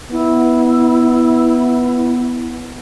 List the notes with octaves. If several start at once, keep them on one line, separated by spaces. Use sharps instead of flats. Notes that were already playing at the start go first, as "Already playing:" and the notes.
B3 E4